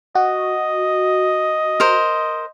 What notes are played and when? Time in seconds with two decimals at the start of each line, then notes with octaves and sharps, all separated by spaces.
0.15 F#4 D#5
1.80 A#4 C5